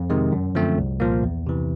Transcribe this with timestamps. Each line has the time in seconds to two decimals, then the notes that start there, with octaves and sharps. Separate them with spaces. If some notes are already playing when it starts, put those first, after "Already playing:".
Already playing: F2
0.10 C3 D#3 G#3
0.32 F#2
0.55 D3 F3 A3 C4
0.78 C2
1.00 A#2 F3 A#3
1.23 E2
1.46 C3 E3